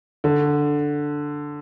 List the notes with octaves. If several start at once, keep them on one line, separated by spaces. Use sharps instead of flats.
D3